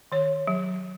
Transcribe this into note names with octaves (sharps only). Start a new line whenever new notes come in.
D#3 C#5
F#3